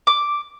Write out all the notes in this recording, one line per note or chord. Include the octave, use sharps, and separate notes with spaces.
D6